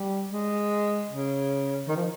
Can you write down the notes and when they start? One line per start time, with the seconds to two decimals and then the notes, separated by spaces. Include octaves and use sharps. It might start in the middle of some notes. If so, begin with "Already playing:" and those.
Already playing: G3
0.32 G#3
1.11 C#3
1.88 D#3
1.96 F3